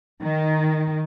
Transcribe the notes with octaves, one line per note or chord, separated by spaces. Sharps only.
D#3